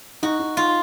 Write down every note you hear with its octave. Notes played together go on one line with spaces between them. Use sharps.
D#4 F#4
D#4
D#4 F4